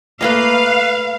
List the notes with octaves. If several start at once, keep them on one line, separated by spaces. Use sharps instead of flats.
A3 A#3 B4 D#5 F5